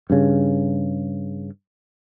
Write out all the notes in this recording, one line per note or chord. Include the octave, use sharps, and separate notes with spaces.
G2 C#3